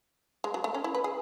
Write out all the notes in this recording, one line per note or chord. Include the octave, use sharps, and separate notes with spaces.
G#3
F#3
A3
C#4
E4
B4
G#4